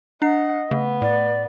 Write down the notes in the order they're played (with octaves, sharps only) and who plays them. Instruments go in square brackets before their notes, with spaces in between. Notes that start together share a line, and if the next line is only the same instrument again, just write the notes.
[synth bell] D4 C7 [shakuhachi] D#5 [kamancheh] F#5
[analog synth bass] C#3 [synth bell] A3 [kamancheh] B3
[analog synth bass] A2 [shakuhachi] D5